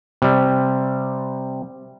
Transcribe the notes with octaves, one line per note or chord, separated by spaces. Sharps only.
C3 G3